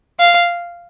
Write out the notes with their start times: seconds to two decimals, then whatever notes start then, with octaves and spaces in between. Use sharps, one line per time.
0.20 F5